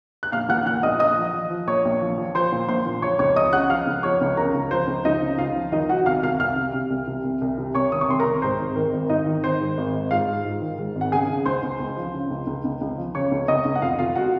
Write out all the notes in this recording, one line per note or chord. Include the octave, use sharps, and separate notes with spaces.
F#6
A#1 F5 F6
A#2 F#5 F#6
A#2 F#5 F#6
A#1 D#5 D#6
F3 D#5 D#6
F3
F3
F3
A#1 C#5 C#6
A#1
F3
F3
F3 C5 C6
A#2
A#1 C5 C6
A#2
F3 C#5 C#6
C#2 C#5 C#6
C#2 D#5 D#6
C#3 F#5 F#6
F3 F5 F6
C#2
F3 C#5 C#6
C#2
C#3 A#4 A#5
C#2
F3 C5
C#2
C#2 D#4 D#5
C#3
C#2 F4 F5
F3
D#3 D#4 D#5
D#3 F#4 F#5
C2 F5 F6
C2 F5 F6
C2 F5 F6
C3
C3
C2
C3
C2
C2
C3
C2 C#5 C#6
D#3 D#6
C#6
C2 C6
A#4 A#5
C2
G#2 C5
G#1
D#3 A#4
G#1
G#1 D#4 D#5
D#3
D#3 C5
G#2
G#1
G#2
G#2 F4 F5
G#2
G#2
D#3
G#2
G#1
F#5
C#3 G#4 G#5
C#3
C#2 C5 C6
C#2
C#2
F3
C#3
C#2
C#2
C#2
C#2
F3
C#3 C#5 C#6
C#2
C#2 D#5 D#6
C#2
F#5
F1 F4 F5
F1 F4 F5
F#4 F#5